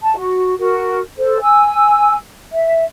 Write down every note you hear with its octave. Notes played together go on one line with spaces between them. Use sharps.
A5
F#4
F#4 A#4
A4 C5
G#5 E6
E5